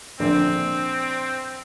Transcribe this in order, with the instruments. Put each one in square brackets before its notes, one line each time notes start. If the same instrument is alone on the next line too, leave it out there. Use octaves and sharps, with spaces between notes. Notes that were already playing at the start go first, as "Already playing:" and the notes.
[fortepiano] A#1 D3 [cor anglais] C4